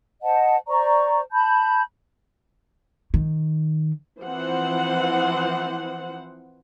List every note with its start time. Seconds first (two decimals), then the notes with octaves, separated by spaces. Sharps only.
0.22 C5 D#5 F#5 A5
0.67 C5 D5 A#5 C#6
1.32 A5 B5 G6
3.14 D#3
4.22 E3 F3 C4 C5 F#5